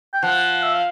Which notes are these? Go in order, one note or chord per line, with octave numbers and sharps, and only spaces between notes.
G5
F3 F#5
E5
F5